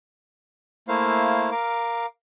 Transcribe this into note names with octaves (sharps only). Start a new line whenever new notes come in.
A3 A#3 E4 C5 F5
A#4 F5 D6